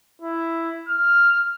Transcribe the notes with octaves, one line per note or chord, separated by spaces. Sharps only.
E4
F6